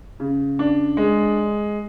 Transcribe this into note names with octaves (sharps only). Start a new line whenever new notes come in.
C#3
D4
G#3